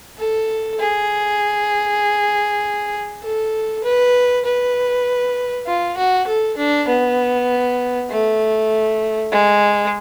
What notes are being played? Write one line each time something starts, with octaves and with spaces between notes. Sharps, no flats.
A4
G#4
A4
B4
B4
F4
F#4
A4
D4
B3
A3
G#3